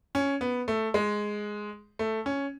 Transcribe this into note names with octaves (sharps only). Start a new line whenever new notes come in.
C#4
B3
A3
G#3
A3
C#4